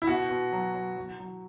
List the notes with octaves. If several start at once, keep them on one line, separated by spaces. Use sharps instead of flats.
E4
B2 F#4
B2
F#3
F#3
F#3
F#3